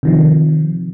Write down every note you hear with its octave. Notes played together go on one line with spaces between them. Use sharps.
C3 D#3 F3